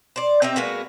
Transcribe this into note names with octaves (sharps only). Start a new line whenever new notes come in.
C5 D5
C4 D#4 G4 E5
G#3 A#3 B3 F#4